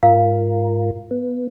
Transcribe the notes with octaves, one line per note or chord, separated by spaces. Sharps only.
G#2 F4 A#4 F5
B3